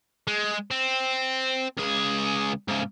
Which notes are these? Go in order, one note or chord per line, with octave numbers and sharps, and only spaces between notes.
G#3
C4
C#2 G#4
G#2 C#3